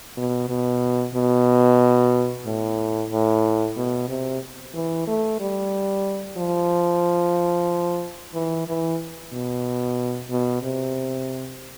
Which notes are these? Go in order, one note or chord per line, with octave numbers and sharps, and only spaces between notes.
B2
B2
B2
A2
A2
B2
C3
E3
A3
G3
F3
E3
E3
B2
B2
C3